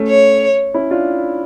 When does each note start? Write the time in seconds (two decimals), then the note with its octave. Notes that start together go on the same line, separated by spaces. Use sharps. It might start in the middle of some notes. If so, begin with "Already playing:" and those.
Already playing: A3 C#4
0.09 C#5
0.74 C#4 E4
0.90 D4 F4